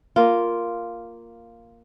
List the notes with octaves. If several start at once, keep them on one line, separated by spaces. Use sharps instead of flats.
A#3 F4